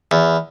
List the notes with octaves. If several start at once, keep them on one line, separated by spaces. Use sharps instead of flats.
E2